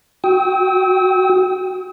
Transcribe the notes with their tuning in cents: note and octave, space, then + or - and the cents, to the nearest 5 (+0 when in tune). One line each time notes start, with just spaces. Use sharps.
F#4 +0 G5 +0 D#6 +45